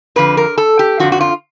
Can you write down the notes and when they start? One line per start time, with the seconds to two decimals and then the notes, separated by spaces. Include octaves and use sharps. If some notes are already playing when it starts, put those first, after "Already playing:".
0.16 F2 D3 F3 B4
0.37 A#4
0.58 A4
0.79 G4
1.00 F2 D3 F3 F#4
1.12 F#4
1.21 F4